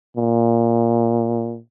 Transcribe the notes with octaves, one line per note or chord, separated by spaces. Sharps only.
A#2